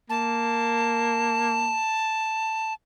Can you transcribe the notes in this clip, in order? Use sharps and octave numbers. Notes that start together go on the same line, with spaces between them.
A#3 A5